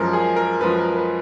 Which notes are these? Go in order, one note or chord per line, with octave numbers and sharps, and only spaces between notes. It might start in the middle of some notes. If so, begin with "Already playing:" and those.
Already playing: F#2 F3 G#3 A#4
G#4
A#4
F#2 F3 G#3 B4
A#4
B4